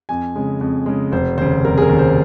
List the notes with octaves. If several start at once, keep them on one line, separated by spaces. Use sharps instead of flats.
F2 G#5
C#3 G#3
F2
C#3 G#3
F1 C5
D#2 C#3 C5
F1 A#4
G#4
A#4
D#2 C#3
C5